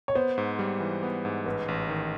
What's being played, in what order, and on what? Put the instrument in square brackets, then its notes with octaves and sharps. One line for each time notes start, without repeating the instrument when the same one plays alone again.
[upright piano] C#5
[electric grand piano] B3 [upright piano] C5
[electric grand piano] G#2
G3
E3
B3
G#2
[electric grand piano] A1 [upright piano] B4
[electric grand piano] A1
D#3